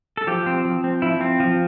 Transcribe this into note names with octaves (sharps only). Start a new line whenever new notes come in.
A4
F3 G4
C4
F3
C4
F3 E4
C4
F3